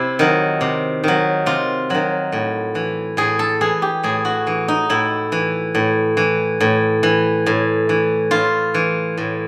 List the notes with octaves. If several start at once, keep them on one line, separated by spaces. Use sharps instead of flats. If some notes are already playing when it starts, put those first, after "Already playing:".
Already playing: C3 E4
D#3 F#3
C3
D#3 F#3
C3 F4
D#3 F#3
A2
E3
A2 G#4
A4
E3 G#4
G4
A2 G#4
F#4
E3
D#4
A2 E4
E3
A2
E3
A2
E3
A2
E3
A2 F4
E3
A2